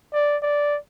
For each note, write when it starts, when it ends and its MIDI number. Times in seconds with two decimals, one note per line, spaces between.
0.13 0.37 74
0.42 0.78 74